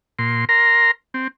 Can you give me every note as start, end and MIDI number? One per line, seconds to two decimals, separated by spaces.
0.19 0.45 46
0.19 0.45 84
0.49 0.91 70
0.49 0.91 82
0.49 0.91 84
1.14 1.28 60